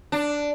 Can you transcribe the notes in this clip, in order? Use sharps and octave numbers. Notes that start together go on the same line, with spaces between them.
D4